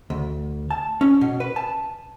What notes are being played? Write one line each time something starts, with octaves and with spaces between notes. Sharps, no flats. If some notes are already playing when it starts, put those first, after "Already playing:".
D2
A5
C#4
B2
B4
A5